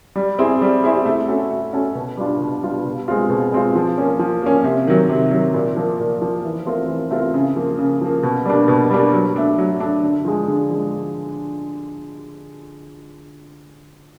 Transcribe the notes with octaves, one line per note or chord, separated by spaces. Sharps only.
G3
C4 E4 G#4
G3
C4 E4 G#4
A3
C#4 F#4 A4
A3
C#4 F#4 A4
B2
G3 B3 D4 F4
B2
G3 B3 D4 F4
B2
G#3 C4 F4
B2
G#3 C4 F4
F3
A#3 C#4
F3
A#3 C#4
C3
D#3 F#3
C3
D#3 F#3
A#2
F3 A#3
A#2
F3 A#3
E3
A3 C4 F4 A#4
E3
A3 C4 F4 A#4
C#3
F3 A#3
C#3
F3 A#3
B2
G3 A#3 D4
B2
G3 A#3 D4
F#3
A3 D4
F#3
A3 D4
D3
F3 G#3
D3
F3 G#3